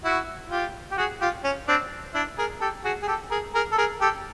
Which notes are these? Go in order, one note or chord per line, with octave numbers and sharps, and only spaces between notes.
E4 F#4
F4 G4
G4
F#4 G#4
F4 G4
C#4
C4 D4
D4 E4
G#4 A#4
G4 A4
F#4 G#4
G#4
G4 A4
G#4 A#4
G#4 A#4
A4
G#4 A#4
G4 A4